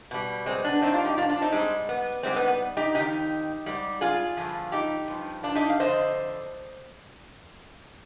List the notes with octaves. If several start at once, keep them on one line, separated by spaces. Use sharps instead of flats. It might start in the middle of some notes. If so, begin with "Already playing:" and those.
B2 G3
G#3 C4
B3 D4
G2 F3 C4 D#4
D4 F4
D#4 G4
D4 F4
D4 F4
C4 D#4
G#2 G3 G#3 C4
B3
G#2 G3 G#3 C4
B3
B3
D#4 G4
F2 C3 D#3 D#4 G4
G#2 G3
F4 G#4
G2 D3 F3
D#4 G4
G2 F3
D4 F4
D#4 G4
F5
F2 D3 F3 C5 D#5